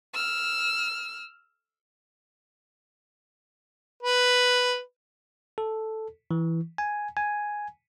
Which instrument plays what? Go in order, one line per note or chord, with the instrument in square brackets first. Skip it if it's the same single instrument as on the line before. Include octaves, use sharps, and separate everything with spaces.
[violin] E6 F6
[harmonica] B4
[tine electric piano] A4
E3
G#5
G#5